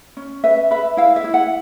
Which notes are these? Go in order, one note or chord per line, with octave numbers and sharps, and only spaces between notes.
C#4
B4 E5
B4 E5
E4 F5
E5
E4
F#5